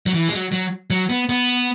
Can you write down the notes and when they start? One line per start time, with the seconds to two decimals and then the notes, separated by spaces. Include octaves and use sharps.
0.06 F#3
0.14 E3
0.29 G#3
0.33 F#3
0.52 F#3
0.90 F#3
1.09 B3
1.29 B3